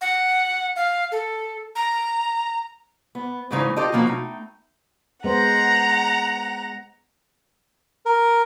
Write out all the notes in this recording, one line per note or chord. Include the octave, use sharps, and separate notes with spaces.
F#5
F5
A4
A#5
B3
E2 G#2 C#3 E3 A3 D#4
F4 G4 A4 D#5
B2 F3 A#3 C#4 F#4
A3 D#4 G5
G#3 B3 C5 F#5 A#5
A#4